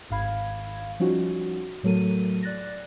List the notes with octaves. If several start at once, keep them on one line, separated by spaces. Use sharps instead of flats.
G#1 G#2 F5 B5 G#6
F3 G3 C#4 D#4 F4 F#4
A2 F#3 A3 A4 A#4 D#7
D5 F#6 A6 A#6